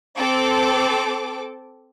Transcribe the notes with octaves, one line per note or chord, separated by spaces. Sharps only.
C4 A4 D6